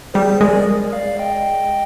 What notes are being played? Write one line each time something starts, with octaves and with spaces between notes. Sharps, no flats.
G3 G#4 C5
G#3 A#4 D5
D5 F5
D#5 G5